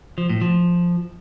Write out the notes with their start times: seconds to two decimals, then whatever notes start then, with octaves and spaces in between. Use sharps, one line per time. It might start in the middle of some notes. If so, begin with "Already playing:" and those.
0.18 F3
0.30 A2
0.41 F3